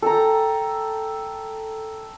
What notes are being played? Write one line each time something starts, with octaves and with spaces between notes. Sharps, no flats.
A4 G5 A#5